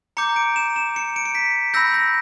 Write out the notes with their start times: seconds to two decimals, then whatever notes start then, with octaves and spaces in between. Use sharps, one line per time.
0.17 A#5 D6 G6 C#7
0.36 D7
0.56 E7
0.76 E7
0.96 C#7
1.16 D7
1.25 C#7
1.35 B6
1.74 B5 E6 G6 A#6
1.94 A#6